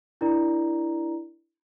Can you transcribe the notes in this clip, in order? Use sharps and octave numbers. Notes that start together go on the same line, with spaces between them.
D4 E4 A#4 D5 A#5